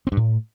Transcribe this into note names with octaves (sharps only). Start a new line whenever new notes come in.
C4
G2
A2